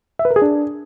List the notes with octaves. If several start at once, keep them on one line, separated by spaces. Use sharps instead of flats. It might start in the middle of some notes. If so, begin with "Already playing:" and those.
E5
B4
A#4
G#4
D4